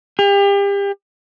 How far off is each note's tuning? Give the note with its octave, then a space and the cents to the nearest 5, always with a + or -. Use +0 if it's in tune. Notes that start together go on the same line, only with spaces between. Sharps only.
G4 +35